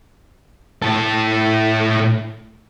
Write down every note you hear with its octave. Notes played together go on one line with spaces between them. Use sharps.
A2 A4